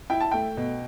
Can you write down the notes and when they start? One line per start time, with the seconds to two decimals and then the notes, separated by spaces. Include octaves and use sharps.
0.10 E4 G5
0.21 A5
0.31 A3 G5
0.57 B2